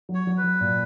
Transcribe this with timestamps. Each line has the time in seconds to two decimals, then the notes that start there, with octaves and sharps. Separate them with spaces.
0.09 F#3
0.15 C#5
0.27 F#3
0.37 B4
0.44 F#3
0.61 A#2